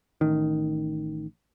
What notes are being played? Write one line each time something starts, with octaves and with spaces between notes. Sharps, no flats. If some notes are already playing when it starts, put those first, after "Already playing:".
A1 D#3